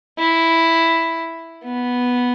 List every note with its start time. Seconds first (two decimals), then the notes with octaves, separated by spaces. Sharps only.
0.18 E4
1.64 B3